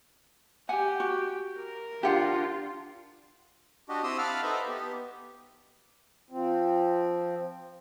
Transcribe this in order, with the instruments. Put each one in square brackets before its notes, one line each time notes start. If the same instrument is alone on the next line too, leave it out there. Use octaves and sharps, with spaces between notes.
[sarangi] G4 [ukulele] F#5 G#5
[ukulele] F#4
[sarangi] A#4
[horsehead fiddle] D4 F4 [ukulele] G4 F#5
[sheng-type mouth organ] D4 F#4 G4 D#5
C4 E4 G4 C6 D#6 E6
F5 F#5 A5 B5 D6 F6
D#4 A4 B4 C5 D#5 E5
B3 G4
[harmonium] F3 C4